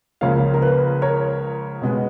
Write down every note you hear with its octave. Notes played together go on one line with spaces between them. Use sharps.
C#2 C#3 F3 A#3 C#5 F5
A#4
B4
A#4 C#5
B2 G#3 B3